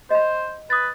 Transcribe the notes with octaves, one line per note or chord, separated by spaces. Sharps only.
C5 D#5 B5
B4 D#6 A6